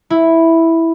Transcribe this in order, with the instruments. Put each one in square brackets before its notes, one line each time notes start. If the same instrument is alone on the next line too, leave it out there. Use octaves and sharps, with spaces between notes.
[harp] E4